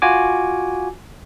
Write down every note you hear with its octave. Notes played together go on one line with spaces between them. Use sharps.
F4 F#4 G#5 D6